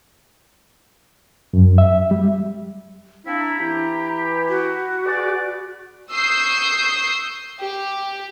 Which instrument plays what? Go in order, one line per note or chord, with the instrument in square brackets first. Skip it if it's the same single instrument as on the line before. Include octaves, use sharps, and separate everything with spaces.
[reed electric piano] F#2
E5
G3
[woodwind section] C4 D4 E4 [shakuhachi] F5
[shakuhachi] A#5
[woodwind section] E3 E4 G4
[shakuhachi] F#4
[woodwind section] G#4 B4 D5
[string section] C#6 D#6 E6 G6 C7
G4